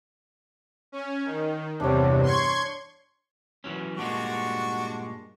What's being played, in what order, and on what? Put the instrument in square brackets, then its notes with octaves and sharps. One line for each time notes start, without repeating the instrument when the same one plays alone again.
[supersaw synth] C#4
D#3
[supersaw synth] E2 G2 C3 [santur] D4 C#5
[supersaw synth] C6 C#6 G#6
[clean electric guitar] E3 F#3 C#4
[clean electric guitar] G2 A#2 G#3 [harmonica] D4 F#4 C#6